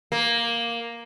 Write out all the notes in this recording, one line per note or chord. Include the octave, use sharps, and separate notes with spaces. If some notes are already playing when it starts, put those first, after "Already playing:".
A#3